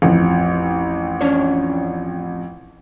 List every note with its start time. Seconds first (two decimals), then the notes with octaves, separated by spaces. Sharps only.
0.02 A1 F2
1.21 C#4 D4 C#5